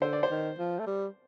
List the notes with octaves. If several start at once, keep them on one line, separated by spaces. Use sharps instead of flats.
D3 C5
D5
C5
D#3
F3
A3
G3